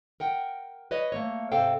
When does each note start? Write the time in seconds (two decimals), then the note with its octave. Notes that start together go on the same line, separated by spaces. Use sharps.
0.20 A#4 F#5 G5
0.91 B4 C#5 D#5
1.12 A3 A#3 C#5
1.52 G#2 C3 A4 C5 F5 G5